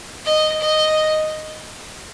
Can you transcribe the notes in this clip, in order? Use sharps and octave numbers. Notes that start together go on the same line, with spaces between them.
D#5
D#5